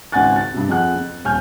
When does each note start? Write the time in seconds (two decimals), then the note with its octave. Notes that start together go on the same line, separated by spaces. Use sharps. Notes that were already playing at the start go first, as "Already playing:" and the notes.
0.12 G#1 C#2 F#5 G#5 F#6 A6
0.36 A6
0.54 G2 C3
0.68 F2 F3 G#4 F#5 F#6
0.96 F2
1.25 D#1 G#5 F6 G6